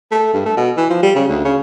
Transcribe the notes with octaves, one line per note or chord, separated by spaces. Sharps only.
A3
G2
A3
B2
E3
F3
G3
C#3
D2
C#3